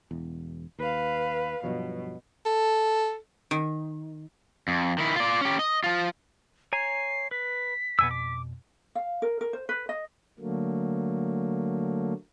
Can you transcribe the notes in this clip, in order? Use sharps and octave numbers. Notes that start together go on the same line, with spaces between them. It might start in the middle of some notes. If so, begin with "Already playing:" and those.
E1 E2
D#2 B4 F5
G2 B2 F3 F#3
A4
D#3
F2
D#3 E4
F4 D5
C#4 G4
D#5
F3 F4
C#5 G#5 A#5 C7
B4 B6
F2 B2 B3 G#5 E6
D6
F5
A#4
A#4
C5
B4
D#5
D3 F#3 A3 A#3